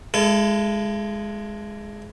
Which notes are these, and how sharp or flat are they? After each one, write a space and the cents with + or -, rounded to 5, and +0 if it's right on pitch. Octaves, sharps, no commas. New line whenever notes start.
G#3 +0 E4 +45 A4 +0